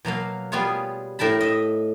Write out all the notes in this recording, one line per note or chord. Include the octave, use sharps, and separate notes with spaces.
B2 F#3 A#3 F5
G3 B3 F4 G#4 C#5
A2 A#4 G5 A5 B5
D#5 E5